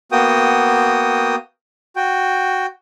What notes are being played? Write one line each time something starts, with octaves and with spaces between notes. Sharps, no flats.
A#3 B3 F#4 G5 D#6
F#4 G5